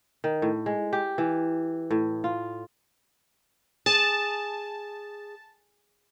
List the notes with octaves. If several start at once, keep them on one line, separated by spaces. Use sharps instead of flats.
D#3
A2
G#3
G4
E3
A2
F4
G#4 A5